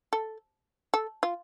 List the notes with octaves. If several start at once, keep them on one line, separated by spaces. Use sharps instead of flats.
A4
A4
F4